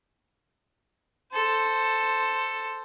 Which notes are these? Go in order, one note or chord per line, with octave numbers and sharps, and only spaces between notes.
A4 C5